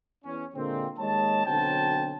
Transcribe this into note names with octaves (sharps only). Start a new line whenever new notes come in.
E2 C#4
A#2 D3 G#3 A#3 C4
D#2 G#3 C#5 D#5 A5
B1 D3 F#3 C4 G5 A5